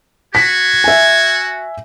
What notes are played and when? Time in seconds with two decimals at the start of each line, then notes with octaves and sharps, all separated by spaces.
0.35 F#4 G#6 B6
0.84 E5 G#5